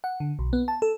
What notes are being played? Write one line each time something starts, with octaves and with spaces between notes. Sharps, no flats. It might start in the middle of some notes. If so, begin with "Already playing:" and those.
F#5
D3
B1
B3
A5
A4